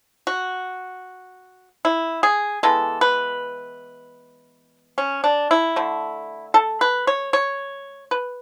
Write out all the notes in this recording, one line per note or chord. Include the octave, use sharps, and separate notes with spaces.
F#4
E4
G#4
E3 G#3 B3 A4
B4
C#4
D4
E4
D3 A3
A4
B4
C#5
C#5
B4